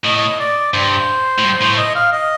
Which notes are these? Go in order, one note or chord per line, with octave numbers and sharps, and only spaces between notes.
A2 D#5
D5
G2 C5
A2
G2
A2
D#5
F5
D#5